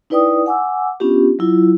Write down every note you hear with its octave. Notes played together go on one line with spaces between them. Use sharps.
D#4 E4 B4 D5 G5 D#6
F#5 G#5 D6 E6
B3 C#4 D4 F4 G4
F#3 E4 F4